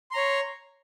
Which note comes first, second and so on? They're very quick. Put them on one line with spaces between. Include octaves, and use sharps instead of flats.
C6 A#5 C#5